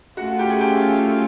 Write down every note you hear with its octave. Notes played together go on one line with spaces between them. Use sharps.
A3 C#4 F4 F#4 F#5
G4 G5
G#4 G#5
G4 G5